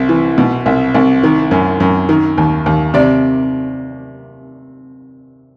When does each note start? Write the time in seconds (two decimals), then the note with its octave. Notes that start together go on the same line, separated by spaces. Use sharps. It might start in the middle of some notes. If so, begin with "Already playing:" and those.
Already playing: C2 C3
0.09 E3
0.38 B2
0.66 C2
0.94 C2
1.23 D#3
1.51 F#2
1.80 F#2
2.09 D#3
2.38 D#2
2.66 D#2
2.94 C3 D5